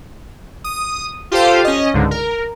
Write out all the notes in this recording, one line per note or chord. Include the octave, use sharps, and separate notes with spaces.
D#6
F4 G4 A4 C5 F5
C#4 D#5
C#2 G#2 D3
A#4